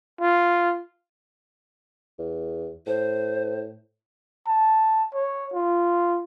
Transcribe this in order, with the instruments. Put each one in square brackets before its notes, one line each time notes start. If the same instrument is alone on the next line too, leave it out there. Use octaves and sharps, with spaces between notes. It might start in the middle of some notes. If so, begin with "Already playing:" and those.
[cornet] F4
[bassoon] E2
[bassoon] A2 [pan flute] C5
[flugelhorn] A5
C#5
F4